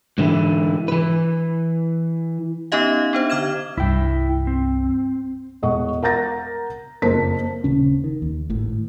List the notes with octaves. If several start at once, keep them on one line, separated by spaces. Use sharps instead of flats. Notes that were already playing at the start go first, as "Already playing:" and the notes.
G#2 D3 E3 E4
E3 B4
B3 C#4 D#4 G4 D#5 F5
B3 D4 C5
D3 D6 F6 G#6 E7
C2 G2 E4 G5
C4
E1 D#5 F#5 C#6
A#4 F#5 A#5 G6 A6 A#6
F#1 F2 A#4 C5 A5 B6
D#1 C#3 C#4
D#3
D#2
G#1 A2